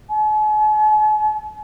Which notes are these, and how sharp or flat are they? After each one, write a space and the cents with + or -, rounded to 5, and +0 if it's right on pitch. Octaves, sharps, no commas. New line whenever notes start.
G#5 +45